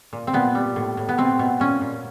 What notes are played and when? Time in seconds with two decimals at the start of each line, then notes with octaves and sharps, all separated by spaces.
0.13 A#2
0.27 C4
0.33 A#2 B3
0.55 G3
0.76 A2
0.97 A2
1.09 B3
1.18 B2 C4
1.39 B2
1.60 A#2 C#4
1.81 A#2